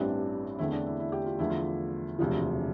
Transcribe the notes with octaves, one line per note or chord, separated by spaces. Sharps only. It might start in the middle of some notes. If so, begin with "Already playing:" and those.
Already playing: A1 G2 E3 G3 C4 D4
E2 D3 A3 C4 E4
D4
E4
E4
G4
F4
E2 D3 F3 A3 E4
F4
E1 D2 C3 F3